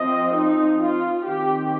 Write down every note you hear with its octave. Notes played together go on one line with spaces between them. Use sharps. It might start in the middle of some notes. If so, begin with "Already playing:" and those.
Already playing: F3 C4 D#5
D#4
F4
D#3 C4 G4